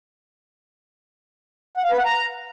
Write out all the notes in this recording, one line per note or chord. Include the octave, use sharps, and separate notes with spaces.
F#5
F5
B4
F#5
A#5